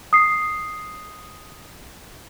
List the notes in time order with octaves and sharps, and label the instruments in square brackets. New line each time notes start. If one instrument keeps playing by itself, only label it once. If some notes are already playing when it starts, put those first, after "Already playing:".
[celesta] D#6 C7